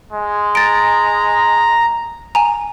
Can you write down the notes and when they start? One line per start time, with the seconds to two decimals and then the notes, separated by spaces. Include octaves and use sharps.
0.12 G#3
0.55 A#5 A6 D7
2.35 G#5 A#5